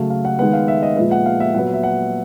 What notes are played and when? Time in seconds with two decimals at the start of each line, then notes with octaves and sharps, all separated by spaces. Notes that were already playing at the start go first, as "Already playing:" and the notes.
Already playing: C#3 F#3 A3 F5
0.10 F5
0.25 F#5
0.39 D#3 G#3 B3 F#5
0.53 F5
0.68 E5
0.83 D#5
0.97 A#2 F3 G#3 B3 E5
1.11 F#5
1.26 F5
1.40 E5
1.54 A#2 F#3 B3 F#5
1.74 E5
1.83 F#5